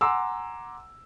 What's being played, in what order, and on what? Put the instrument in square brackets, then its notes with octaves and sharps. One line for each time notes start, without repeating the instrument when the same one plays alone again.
[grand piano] F#5 G#5 A#5 C6 D6 E6